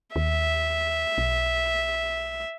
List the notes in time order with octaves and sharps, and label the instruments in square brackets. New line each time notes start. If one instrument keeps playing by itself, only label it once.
[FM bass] D#2 [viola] E5
[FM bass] B1